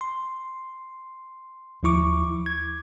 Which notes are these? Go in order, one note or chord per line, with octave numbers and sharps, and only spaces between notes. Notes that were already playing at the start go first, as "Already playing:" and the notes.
C6
D#2 F3 E4 C#6 D6
G#6